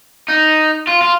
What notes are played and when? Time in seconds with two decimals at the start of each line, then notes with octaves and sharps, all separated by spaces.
0.28 D#4
0.87 F4
1.01 F4